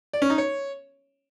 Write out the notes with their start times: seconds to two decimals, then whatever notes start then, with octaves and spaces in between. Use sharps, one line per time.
0.13 D5
0.22 C#4
0.30 D#4
0.38 C#5